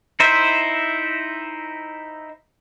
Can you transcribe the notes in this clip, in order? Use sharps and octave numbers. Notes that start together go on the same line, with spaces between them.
D#4 E4 C5 E5